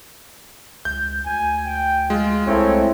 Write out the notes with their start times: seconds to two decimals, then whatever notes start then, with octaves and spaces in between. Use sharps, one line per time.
0.85 C#2 G6
1.26 D2 G#5
1.66 G5
2.10 G#3 F4
2.47 C2 A3 C4 E4 C#5